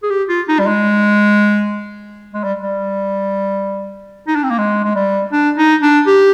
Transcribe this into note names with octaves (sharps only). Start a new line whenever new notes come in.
G#4
G4
F4
D#4
G3
G#3
G#3
G3
G3
D#4
D4
C4
A#3
G#3
G#3
G3
D4
D#4
D4
G4